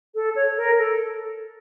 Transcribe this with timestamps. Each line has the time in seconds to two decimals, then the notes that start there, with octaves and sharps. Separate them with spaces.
0.15 A4
0.36 C#5
0.57 A#4
0.78 A4